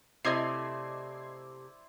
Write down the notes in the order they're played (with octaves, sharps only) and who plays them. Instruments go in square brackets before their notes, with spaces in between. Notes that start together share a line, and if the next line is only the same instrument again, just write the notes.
[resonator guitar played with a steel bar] C3 A3 [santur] E4 C5 D5 [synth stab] D#5 G#6 C7